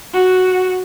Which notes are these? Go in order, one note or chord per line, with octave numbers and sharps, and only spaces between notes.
F#4